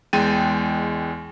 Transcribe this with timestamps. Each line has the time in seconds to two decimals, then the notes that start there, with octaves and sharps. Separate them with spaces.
0.13 E2 G#3 G5 A6 D#7